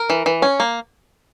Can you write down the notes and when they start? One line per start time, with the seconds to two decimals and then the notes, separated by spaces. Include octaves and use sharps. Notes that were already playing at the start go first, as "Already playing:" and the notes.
Already playing: A#4
0.10 E3
0.26 E3
0.42 C#4
0.60 A#3